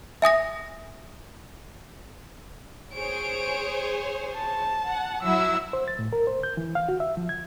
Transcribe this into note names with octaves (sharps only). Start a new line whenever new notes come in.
E5 G#5 D#6 A#6
G#4 C5 C#5 D7
A5
F#5
F#3 E4 F#4 E6
C5
A6
A2
A#4
C5
G6
E3
F5
F#4
E5
F3
G#6